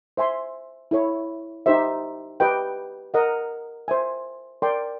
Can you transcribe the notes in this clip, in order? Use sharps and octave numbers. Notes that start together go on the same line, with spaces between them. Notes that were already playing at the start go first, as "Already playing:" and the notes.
C5 E5 G#5 C6
E4 A4 C#5
D#4 G4 C5 E5
G4 B4 D#5 G5
A#4 D#5 F#5
C5 E5 G#5
A#4 D5 G5 C6